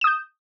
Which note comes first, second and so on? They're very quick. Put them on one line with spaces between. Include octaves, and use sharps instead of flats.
E7 D#6 G6